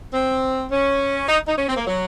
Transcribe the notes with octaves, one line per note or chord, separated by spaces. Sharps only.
C4
C#4
D#4
D#4
C#4
C4
A#3
F#3